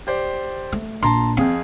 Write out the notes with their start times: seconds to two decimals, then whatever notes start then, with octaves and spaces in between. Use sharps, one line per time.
0.07 G4 C5 D5
0.72 A3
1.03 A#1 A5 A#5 C6
1.37 F2 C4 G#4 F5